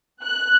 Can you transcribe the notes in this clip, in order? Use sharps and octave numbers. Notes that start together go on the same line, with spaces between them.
F#6